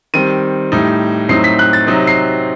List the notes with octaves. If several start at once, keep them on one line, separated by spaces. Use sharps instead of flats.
D#3 G3 C4 D#7
A2 G3 D#4
A2 F#3 C4 D#4 C7
B6
F#6
A6
C3 F#3 C4 D#4
C7